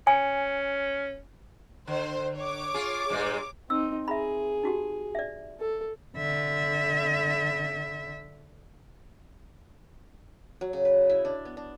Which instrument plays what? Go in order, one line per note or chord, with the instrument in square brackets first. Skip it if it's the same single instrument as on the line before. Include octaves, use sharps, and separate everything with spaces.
[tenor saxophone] C#4 [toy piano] G#5
[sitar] D3 [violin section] C5
[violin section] C#5 D6
[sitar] F4 G#4
G2 A#2 G#3
[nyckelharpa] C4 D#4 [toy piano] E6
[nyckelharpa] G#4 [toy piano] E5 A#5 B5
[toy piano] D#4 F#4 G4
D5 E5
[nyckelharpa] A4
[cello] D3 E5
[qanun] F#3
C#3
B4
E4
D4
B3
D4